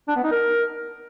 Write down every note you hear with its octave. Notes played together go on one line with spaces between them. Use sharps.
D4
B3
D#4
A#4